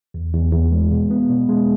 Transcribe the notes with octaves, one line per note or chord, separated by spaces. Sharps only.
E2
E2
E2
G#3
B2
B3
B2
G#3